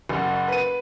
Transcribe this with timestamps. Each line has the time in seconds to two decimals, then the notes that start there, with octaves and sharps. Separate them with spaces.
0.09 F#1 F#4
0.48 B4 D#7